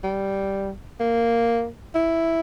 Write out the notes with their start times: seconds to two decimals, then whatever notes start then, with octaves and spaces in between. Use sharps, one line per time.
0.04 G3
1.00 A#3
1.95 E4